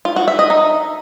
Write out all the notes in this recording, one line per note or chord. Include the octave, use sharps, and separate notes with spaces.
F4
F#4
E5
D#5
D#4